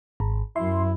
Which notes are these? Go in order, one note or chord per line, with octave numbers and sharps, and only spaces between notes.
G#1
F#2 E4 C6